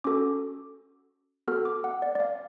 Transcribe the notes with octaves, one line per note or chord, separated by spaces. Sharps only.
C#4 F#4 A4 D6
B3 F#4 A4 F6
D6
F#5
D5
D5
F5